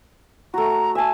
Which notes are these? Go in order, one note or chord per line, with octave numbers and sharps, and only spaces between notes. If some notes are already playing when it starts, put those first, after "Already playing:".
A3 F#4 A#5
E5 G#5 A5